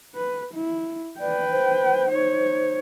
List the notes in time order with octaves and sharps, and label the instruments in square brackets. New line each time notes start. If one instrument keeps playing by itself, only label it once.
[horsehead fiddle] B4
E4
[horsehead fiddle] B4 G5 [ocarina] D5
[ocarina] C5
[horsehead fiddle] D#4 C#5